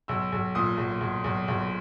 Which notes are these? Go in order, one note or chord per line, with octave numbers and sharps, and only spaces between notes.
B1 E6
B1
A#2 D#6
B1
B1
B1
B1